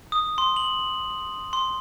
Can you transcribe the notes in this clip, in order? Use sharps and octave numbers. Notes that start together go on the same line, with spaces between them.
D#6
C6
F#7
C6